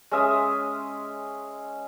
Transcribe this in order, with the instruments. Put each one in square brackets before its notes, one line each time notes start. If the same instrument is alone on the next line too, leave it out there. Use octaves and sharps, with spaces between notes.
[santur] G#3 C#4 E5 D#6